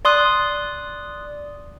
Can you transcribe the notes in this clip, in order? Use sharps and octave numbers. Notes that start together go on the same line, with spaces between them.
D5 C6 D#6 F#6